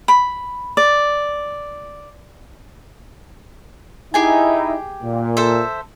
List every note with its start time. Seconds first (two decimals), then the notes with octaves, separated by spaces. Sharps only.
0.08 B5
0.77 D5
4.14 D#4 E4 G4 G#4 G#5
5.03 A#2
5.37 A4 C5 E5